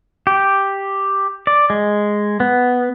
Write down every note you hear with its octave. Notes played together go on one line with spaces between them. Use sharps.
G4
D5
G#3
B3